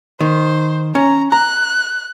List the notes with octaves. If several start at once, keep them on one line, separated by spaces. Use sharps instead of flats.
D#3 C5
C#4 A#5
A#5 F#6